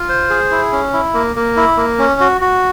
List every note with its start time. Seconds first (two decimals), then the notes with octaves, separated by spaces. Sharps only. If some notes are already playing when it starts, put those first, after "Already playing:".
Already playing: F4
0.09 C5
0.30 G#4
0.51 E4
0.72 C#4
0.93 E4
1.14 A#3
1.36 A#3
1.56 E4
1.77 A#3
1.99 C#4
2.20 F#4
2.41 F#4